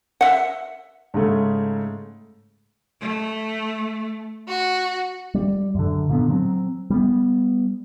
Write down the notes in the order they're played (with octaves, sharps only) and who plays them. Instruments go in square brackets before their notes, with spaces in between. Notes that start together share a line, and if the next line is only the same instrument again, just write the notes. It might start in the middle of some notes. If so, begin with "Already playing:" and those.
[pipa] E5 F#5
[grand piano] G#2 C#3 A3
[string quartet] A3
F#4
[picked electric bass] G3
F#2 D3
A#2 D3 B3
F#3 A#3 C4
G3 B3